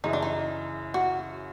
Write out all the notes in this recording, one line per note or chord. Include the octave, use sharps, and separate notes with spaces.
F#2 C#3 E3 D#4
D4
D#4
F#4